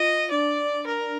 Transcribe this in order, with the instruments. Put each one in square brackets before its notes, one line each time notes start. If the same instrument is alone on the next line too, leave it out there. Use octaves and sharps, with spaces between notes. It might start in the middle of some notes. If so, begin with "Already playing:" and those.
Already playing: [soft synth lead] F4 [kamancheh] D#5
[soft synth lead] D4 [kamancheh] D5
[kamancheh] A#4